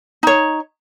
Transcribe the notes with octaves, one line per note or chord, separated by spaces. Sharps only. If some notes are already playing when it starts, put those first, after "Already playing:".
D#4 C#5